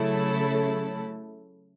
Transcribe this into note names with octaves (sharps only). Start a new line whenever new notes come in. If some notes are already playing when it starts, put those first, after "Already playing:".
Already playing: C#3 F#3 A3 E4 A4